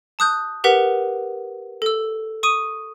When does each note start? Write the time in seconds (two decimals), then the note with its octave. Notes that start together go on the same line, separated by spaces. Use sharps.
0.19 A5 D#6 F#6 G6
0.64 G4 A#4 B4 F#5 B6
1.82 A4 E6
2.43 C#6 D#6 D#7